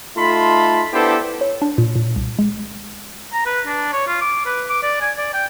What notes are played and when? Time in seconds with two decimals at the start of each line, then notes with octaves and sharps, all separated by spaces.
0.16 A3 D#4 F4 A5 B5 C6
0.92 B3 D4 E4 G4 A4 C5
1.41 C#5
1.62 D4
1.78 A#2
1.95 A#2
2.16 C2
2.39 G#3
3.33 A#5
3.46 B4
3.66 D4
3.92 C#5
4.08 F4
4.21 D6
4.46 B4
4.70 D6
4.83 D5
5.01 G#5
5.18 D5
5.34 G5